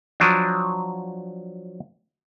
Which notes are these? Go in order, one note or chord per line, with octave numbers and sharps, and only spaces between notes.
F3 F#3 D4